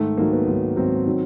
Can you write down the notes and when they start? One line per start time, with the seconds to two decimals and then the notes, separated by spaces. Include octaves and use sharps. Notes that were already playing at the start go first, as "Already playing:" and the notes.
Already playing: G#2 D#3 A3
0.17 G#2 D#3 F#3 A#3
0.33 B3
0.46 G#2 D#3 F#3
0.76 G#2 D#3 F#3 C4
1.06 D#3 F#3